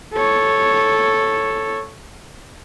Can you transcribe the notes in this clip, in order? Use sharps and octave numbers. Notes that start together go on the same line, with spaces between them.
A4 C#5